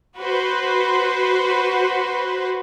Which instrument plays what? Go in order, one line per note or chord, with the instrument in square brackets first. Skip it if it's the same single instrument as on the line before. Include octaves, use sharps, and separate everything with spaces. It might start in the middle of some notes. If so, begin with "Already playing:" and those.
[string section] F#4 B4 C5